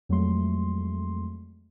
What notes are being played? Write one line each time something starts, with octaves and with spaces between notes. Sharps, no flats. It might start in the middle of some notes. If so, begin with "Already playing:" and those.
F2 F#3 G#3 A3 C6